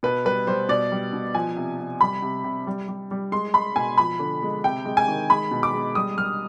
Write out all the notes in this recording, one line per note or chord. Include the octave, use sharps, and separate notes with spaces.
B2 B4
G3 B4
G3 C5
B2 D5
G3
B2
F3 G#5
C3
C3
G3 B5
C3
C3
G3
G3
G3
G#3 C6
G#3 B5
B2 G#5
F3 B5
D3
G#3
C3 G5
G#3
G#5
D#3
G#3 B5
B2
D6
G#3
G3 D#6
G3 F6